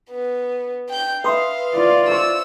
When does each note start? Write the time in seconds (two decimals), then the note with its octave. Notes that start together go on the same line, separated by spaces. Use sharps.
0.11 B3
0.89 G5 G6
1.24 B4 E5 F5 B5 C6 D#6
1.75 F4 D5
2.08 C5 C#6 E6